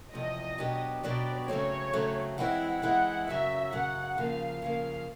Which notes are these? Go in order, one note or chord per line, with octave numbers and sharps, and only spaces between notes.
E2 C3 F3 D#5
B2 F#3 B3 D4 G4
B2 F#3 B3 D4 G4 D5
C#3 F#3 A3 C4 C#5
C#3 F#3 A3 C4
E3 G#3 C4 E4 F#5
E3 G#3 C4 E4 F#5
F#2 C#3 F#3 E5
F#2 C#3 F#3 F#5
C#3 F3 A#3 F5
C#3 F3 A#3 F5